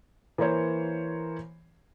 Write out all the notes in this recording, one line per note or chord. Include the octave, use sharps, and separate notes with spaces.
E3 A#3 A#4 C5 C#5